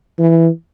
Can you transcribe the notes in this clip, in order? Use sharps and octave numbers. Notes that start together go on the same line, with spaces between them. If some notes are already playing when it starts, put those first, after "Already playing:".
E3